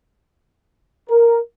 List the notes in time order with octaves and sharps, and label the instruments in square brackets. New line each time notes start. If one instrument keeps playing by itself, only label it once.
[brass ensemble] A#4